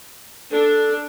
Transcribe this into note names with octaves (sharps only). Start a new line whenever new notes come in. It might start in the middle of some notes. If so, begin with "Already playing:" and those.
D4 A4